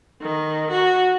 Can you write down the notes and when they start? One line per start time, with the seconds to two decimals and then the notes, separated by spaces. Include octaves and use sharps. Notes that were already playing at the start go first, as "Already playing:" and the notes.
0.22 D#3
0.70 F#4